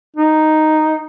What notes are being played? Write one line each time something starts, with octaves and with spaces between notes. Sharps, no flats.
D#4